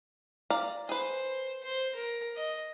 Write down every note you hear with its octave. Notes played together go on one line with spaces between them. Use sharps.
D5 F5 A#5
G#4 B4 C5
C5
A#4
D#5